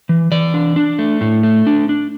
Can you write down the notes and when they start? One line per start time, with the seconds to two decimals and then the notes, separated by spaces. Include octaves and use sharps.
0.09 E3
0.32 E3 D5
0.54 D4
0.76 D4
0.99 A3
1.21 A2
1.43 A3
1.67 D4
1.89 D4